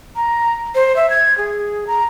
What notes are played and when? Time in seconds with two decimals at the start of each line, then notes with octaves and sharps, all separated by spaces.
0.16 A#5
0.75 C5
0.96 E5
1.10 G#6
1.38 G#4
1.87 A#5